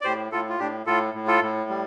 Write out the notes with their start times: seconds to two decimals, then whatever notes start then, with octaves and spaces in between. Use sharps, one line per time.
0.01 D5
0.04 A2 G4 C5
0.32 A2 F4 A4
0.49 F4
0.59 A2 D4 G4
0.86 A2 F4 A4
1.14 A2
1.27 F4 A4
1.42 A2
1.70 G3